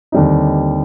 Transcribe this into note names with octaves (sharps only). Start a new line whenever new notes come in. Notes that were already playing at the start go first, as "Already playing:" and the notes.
D#2 D3 G3 C4 D#4